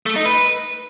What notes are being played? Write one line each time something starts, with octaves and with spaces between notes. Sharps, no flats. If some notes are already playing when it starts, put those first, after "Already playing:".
A3
D#4
B4